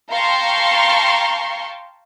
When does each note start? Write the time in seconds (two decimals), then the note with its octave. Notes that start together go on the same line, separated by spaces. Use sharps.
0.11 F5 G5 A5 A#5 C6 C#6